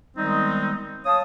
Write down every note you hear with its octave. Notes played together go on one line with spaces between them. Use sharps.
D#3 G3 G#3 B3 C4 D#4
C#5 F5 A5 D#6